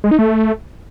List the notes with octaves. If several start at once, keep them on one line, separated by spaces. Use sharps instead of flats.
G#3
D#4
A3